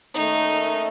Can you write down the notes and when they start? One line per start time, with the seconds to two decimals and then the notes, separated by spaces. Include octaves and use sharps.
0.13 D#2 D#3 A3 C#4 D#4